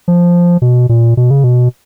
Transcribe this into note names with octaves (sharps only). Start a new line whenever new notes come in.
F3
B2
A#2
B2
C#3
B2